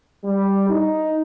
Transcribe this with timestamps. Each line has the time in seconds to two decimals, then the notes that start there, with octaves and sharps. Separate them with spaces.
0.23 G3
0.69 D#4